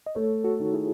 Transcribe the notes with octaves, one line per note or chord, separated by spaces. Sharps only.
D#5
A3 A4 C#5
F#4 A4
D#3
E4 G#4